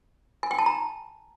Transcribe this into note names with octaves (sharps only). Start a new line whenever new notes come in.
G#5
G5
A5
A#5